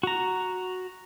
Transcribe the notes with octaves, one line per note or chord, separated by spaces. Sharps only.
F#4 A#5